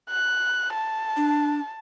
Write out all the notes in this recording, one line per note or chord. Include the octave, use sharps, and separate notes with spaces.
F#6
A5
D4